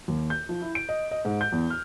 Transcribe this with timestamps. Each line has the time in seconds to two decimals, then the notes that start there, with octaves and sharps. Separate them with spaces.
0.08 D#2
0.30 G6
0.49 F3
0.62 E4
0.75 D7
0.89 D#5
1.11 D#5
1.25 G#2
1.41 G6
1.52 E2
1.70 F6